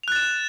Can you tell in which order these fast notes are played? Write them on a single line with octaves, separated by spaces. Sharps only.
F7 F#6 A6 E7